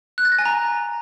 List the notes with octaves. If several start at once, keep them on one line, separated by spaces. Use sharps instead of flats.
F#6
A6
A#6
G#5
A#5